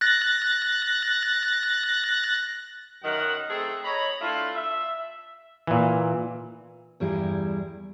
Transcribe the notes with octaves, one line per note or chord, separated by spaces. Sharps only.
F#6 A6 A#6
F#2 D#3 F#5
D#3 A3 C4 G#4 A4
C#5 D#5 A#5 B5
A3 D4 E4 F4
E5
A#2 E3
E2 G2 G3 E4 G#4 A#5